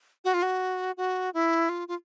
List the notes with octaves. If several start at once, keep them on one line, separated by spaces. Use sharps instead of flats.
F#4
F4
F#4
F#4
E4
F4
F4